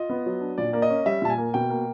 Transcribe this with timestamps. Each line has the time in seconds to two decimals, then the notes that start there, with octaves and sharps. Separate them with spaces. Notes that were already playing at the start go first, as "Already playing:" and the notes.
Already playing: F4 D#5
0.10 B3
0.26 F#3
0.41 D4
0.58 A#2 D5
0.73 A#3 D5
0.82 D#5
0.90 C#4
1.06 G3 E5
1.22 A#2 A5
1.30 G#5
1.38 A#3
1.54 B2 G5
1.70 A#3